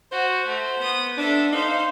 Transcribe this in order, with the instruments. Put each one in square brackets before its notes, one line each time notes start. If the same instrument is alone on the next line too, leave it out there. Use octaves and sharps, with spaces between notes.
[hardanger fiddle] F#4 [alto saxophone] C5
[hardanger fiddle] A3
B3 D#6
[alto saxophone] D4 [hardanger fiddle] A4 E5
[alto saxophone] D#4 [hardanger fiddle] C5 F5